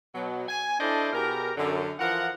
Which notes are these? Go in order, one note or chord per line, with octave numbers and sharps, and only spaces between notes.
B2 F#3
G#5
D4 E4 A4 C5 D5 D#5
B2 G4 G#4 A#4
F#2 D3
E3 F3 F4 A#4 F#5